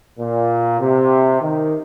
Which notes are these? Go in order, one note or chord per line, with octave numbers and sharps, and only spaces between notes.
A#2
C3
D#3